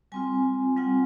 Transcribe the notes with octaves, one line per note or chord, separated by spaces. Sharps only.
G3 C4 F4 G#5
G3 C4 F4 F#5